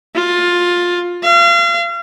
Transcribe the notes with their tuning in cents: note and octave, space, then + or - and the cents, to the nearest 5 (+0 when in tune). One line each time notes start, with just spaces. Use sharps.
F4 +15
F5 -35